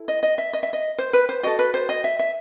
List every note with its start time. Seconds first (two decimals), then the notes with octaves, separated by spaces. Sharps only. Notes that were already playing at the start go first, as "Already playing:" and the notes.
Already playing: E4 A4
0.08 D#5
0.23 D#5
0.38 E5
0.53 D#5
0.63 E5
0.73 D#5
0.98 C5
1.13 B4
1.29 C5
1.43 F#4 A4 D#5
1.59 B4
1.74 C5
1.89 D#5
2.04 E5
2.19 E5